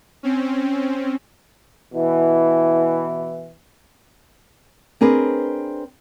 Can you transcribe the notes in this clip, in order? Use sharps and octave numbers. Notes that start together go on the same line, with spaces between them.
C4 C#4
B2 E3
C4 D4 G#4 A#4 B4